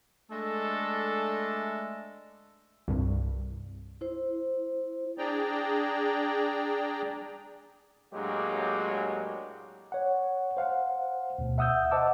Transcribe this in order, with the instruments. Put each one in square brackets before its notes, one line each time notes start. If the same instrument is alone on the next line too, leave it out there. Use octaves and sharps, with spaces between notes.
[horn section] G#3 A3 D4 A4
[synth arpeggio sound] C2 G2
[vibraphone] E4 C5
[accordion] D4 G#4 D5 G5 A#5
[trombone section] A2 F#3 G#3 A#3 D4 G4
[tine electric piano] C#5 F#5
C5 F5 F#5
D2 B2
E5 F#5 D#6 E6 G6
C5 D#5 F#5 A5 D6 E6